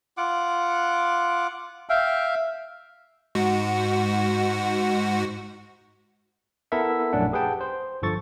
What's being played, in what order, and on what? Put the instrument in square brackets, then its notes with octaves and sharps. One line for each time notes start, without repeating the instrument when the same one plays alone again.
[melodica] F4 F#5 D6
[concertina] E5 F5 [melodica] G5
[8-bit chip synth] G#2 F#4
[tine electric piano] B3 E4 A4 A#4 E5
A#1 F#2 A3 C#4 D4 F#5
G4 G#4 B4 F#5 G5 A5
C5
G1 G2 F3 A4 C#6 A6